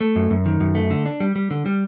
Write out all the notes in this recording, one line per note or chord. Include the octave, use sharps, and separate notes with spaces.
A3
F#2
F#2
D#3
F#2
A3
D3
D4
G3
G3
D3
G3